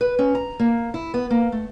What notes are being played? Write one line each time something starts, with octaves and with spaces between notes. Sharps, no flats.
B4
C#4
A#5
A#3
E4
B3
A#3
A3